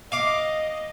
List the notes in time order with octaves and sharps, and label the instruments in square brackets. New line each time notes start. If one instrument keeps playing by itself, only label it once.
[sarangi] D#5 [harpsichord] F5 D6